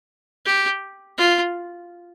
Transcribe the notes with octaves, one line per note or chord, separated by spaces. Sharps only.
G4
F4